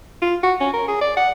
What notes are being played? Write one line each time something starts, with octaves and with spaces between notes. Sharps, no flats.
F4
F#4
C#4
A#4
G#4
D5
F#5